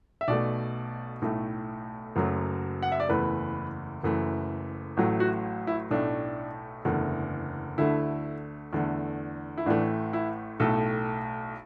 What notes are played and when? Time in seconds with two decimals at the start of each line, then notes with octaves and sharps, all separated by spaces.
0.21 E5
0.28 B1 B2 A3 D5
1.22 B1 A2 A3
2.16 F#1 F#2 F#3 A3
2.83 F#5
2.92 E5
3.00 D5
3.09 F#1 E2 E3 A3 B4
4.03 F#1 F#2 E3 A3
4.97 A1 A2 F#3 A3
5.20 F#4
5.67 E4
5.91 B1 A2 A3 D4
6.85 F#1 E2 D3 A3
7.78 D2 D3 A3 E4
8.73 E2 D3 A3
9.58 E4
9.66 A1 A2 E3 A3 D4
10.13 E4
10.60 B1 A2 A3 A4